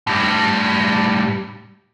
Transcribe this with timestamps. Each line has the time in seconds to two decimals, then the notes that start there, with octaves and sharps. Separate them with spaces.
0.07 A2 G3